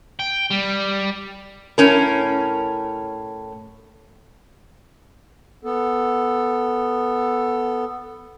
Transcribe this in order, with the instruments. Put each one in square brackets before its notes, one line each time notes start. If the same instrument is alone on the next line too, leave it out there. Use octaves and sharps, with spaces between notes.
[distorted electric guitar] G5
G3
[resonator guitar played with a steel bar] A2 C#4 A#4
[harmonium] B3 A4